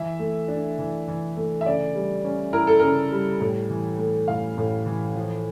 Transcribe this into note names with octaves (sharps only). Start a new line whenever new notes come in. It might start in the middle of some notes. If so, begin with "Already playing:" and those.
Already playing: E3 E5
A3
D4
E3
E3
A3
E5
C#3 D5
G3
C#4
E4 A#4
A4
C#3 A#4
G3
A2
E3
A3
A2 F5
A2
E3
F3